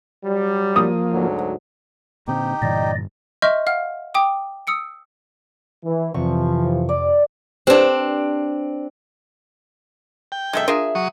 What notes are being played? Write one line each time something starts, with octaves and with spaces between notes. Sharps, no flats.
F#3 G3
F3 A#3 D#6
D2 G#2 F#3
A#2 D3 C4 D#4 G4
G2 A#2 D3 E3 D5 D#5
D#5 E5 C6 C#6 F6 G6
F5 F#5 F6
G5 D6 D#6
D#6 E6 C#7 D7
E3
F2 C3 E3 F3 C#6
D5
C4 D4 G4 B4 C5
G5
F#2 B2 G#3 A4 E5
D4 F4 G#4 A#4 E5
F#3 C#6 D#6